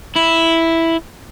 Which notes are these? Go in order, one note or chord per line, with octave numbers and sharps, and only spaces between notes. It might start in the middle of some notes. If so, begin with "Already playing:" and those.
E4